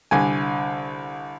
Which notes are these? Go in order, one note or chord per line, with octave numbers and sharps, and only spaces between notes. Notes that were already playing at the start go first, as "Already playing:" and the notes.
C2 D3 G#5